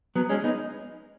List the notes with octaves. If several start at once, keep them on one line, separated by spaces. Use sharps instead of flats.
F#3 B3
G#3 C#4
B3 D#4